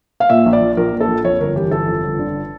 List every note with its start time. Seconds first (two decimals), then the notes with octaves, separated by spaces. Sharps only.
0.20 F5
0.30 A#2 E5
0.46 A#1
0.53 D5
0.61 F3
0.77 A#1 A#4
0.92 A#2
1.01 A4
1.08 A#1
1.24 F2 C#5
1.40 G1 A#4
1.56 E3 G4
1.71 G1 A4
1.88 F2
2.04 G1
2.19 D3